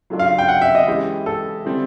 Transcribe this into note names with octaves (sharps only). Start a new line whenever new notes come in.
C#3 F#3 A3 D4 F4
F5
G5
F#5
E5
D#5
E3 G#3 C#4 E4 G4
A4
D3 G3 C4